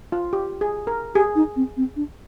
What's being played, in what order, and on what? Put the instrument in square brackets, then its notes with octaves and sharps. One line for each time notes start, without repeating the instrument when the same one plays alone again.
[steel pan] F4
G4
G#4
A#4
[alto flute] G4 [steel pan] G#4
[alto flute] D#4
C4
C4
D4